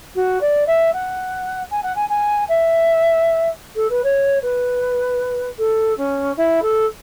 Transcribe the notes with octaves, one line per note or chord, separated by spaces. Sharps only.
F#4
D5
E5
F#5
G#5
F#5
G#5
G#5
E5
A4
B4
C#5
B4
A4
C#4
E4
A4